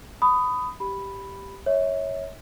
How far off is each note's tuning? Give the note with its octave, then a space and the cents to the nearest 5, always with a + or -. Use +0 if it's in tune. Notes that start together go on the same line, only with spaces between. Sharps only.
B5 +20 D#6 +0
G4 +0 B5 +0
C#5 +0 E5 -30